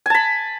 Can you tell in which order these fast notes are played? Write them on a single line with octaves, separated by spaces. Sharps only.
G#5 A5 B5